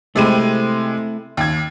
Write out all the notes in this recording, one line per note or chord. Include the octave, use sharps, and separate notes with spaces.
C3 G#3 A3 C4 E4 D#7
D#2 G#6